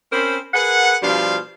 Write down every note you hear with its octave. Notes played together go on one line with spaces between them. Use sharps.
C4 C#4 A#4 C5 B5
G#4 A#4 B4 F#5
B2 F3 G3 D4 F5 C6